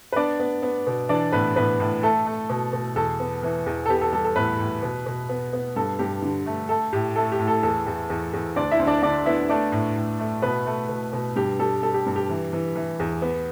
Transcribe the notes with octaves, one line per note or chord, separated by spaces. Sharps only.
B4
B3 D4 D5
B3
B3
B2
E3 D4 D5
A2 B3 B4
A2 B3 B4
A2
A3 A4
A3
B2
B2
E2 A4
B3
E3
E2
A4
B3 G4
A4
G3 A4
A4
A2 B3 B4
A2
B2
B2
B3
B3
G2 A4
G2 G4
D3
A3
A3 A4
A2 G4
A3 A4
G4
A2
A4
E2 A4
E2
E2
E2
D2 D4 D5
E4 E5
D2
D4 D5
D3 D4 D5
B3 E4 E5
A3 D4 D5
A2
A2
A3
B2 B3 B4
A3
B2
B2
G2 G4
G3 A4
G3 A4
G4
G2
G4
E3
E3
E3
E2
B3